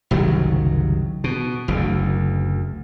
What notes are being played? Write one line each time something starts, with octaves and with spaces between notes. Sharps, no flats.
F#1 C2 D#3 F#3
B2
F#1 D2